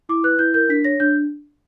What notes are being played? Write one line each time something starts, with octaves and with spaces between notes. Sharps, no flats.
E4 D6
B4 F#6
E4 G6
A#4 G6
D4 B6
C#5 A#6
D4 G6